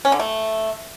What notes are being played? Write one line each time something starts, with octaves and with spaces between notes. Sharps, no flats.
C#4
D3
A3